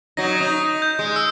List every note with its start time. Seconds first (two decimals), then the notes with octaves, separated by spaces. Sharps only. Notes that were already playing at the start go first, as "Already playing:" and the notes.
0.17 F#3 D#4 A#6
0.41 D#4
0.82 G6
0.99 G#3
1.16 E6